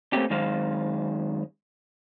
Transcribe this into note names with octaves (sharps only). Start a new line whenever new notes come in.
A3 A#3 C4 C#4 G4
F#2 D#3 G#3 C5 F5